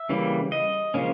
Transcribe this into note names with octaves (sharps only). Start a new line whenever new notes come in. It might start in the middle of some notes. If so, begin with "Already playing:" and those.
Already playing: E5
C#3 E3 G3 A#3
D#5
C#3 F3 A#3 C#4